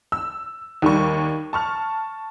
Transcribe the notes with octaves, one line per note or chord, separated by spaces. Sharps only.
E6
D#2 D#3 G3 C#6
A5 C#6 F6